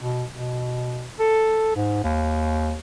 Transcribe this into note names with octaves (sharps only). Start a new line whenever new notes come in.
B2
B2
A4
G#2
D#2